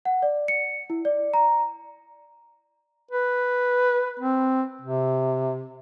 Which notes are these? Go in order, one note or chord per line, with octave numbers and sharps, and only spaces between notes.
F#5
D5
C#7
E4
D5
A#5
B4
C4
C3